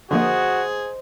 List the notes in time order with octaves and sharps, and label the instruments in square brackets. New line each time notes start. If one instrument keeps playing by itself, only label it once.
[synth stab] D3 F3 A#3 [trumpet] F#4 [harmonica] G#4 [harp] C5 D#5